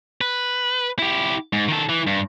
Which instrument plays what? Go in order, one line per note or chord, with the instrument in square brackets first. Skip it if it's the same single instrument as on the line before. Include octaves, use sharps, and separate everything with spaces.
[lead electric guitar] B4
E4 G4
G#2
D#3 A4
E3
G2